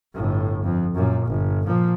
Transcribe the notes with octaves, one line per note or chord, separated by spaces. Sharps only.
G1 A2
F2
F#2 A#2
G1
A#2 F3